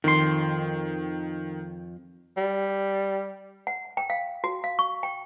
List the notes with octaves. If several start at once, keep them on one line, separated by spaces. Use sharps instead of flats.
F2 D#3 C6
G3
F#5
G5
F5
F#4
F5
C#6
G5